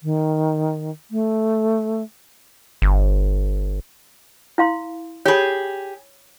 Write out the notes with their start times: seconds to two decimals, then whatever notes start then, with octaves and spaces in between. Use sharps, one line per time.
0.03 D#3
1.11 A3
2.82 G1
4.58 E4 F5 C6
5.25 G4 G#4 C#5 B5